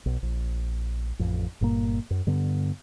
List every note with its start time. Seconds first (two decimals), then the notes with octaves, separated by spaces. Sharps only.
0.06 B1
0.22 A#1
1.19 A1 F2
1.61 G1 G2 A#2 A#3
2.10 F#2
2.27 G2 D3 B3